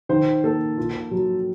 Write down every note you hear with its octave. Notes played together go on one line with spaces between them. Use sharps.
D#3 C5
A#3 A4
F4
F#3